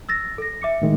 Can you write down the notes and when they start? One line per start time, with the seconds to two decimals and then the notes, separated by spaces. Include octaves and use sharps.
0.09 E6 A6 A#6
0.38 A4 A#6
0.62 E5 D6 C#7
0.82 A2 D#3 G#3